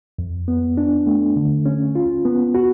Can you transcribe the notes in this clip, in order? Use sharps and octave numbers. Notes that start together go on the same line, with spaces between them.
F2
B3
D4
A3
D3
C#4
F4
B3
F#4